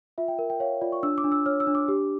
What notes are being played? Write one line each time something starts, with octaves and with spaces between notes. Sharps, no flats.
F4 E5
G5
A#4
G5
C#5 F5
F4 D5
C#6
D4 E6
D6
D4
E6
C#5 F6
E6
D4
D6
G4